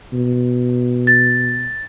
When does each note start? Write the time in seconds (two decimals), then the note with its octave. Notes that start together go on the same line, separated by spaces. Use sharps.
0.13 B2
1.07 A6